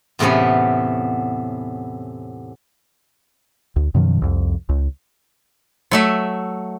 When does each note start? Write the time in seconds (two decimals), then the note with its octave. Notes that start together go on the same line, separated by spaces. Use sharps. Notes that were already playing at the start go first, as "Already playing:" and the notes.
0.19 E2 A2 C3 B3 C#4
3.76 D2
3.94 F#2 B2 D#3 F3
4.22 C2 F2
4.69 C#2
5.91 F#3 A3 E5